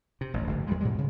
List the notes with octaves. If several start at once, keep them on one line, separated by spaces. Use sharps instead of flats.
C3
A1 F2
F#1 D2 G#2
D#2 F3 G3 G#3
G#2 B2 G3 G#3
D2 C#3